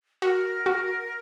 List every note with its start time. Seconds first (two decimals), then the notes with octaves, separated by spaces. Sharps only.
0.22 F#4 A#4
0.66 F#4